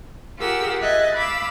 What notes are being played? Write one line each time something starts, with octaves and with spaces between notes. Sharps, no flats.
F4 G4 G#4 A#4 F#5 E6
D#5 E5 F#6 G#6 A6
F5 B5 D6 E6